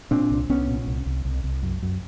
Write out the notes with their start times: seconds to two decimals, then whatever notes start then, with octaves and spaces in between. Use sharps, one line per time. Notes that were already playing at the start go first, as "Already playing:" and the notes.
0.11 A#2 C4 D4
0.31 C2
0.49 C2 B3 C#4
0.68 A#2
0.87 C2
1.06 C2
1.25 C2
1.44 C2
1.63 F#2
1.82 F#2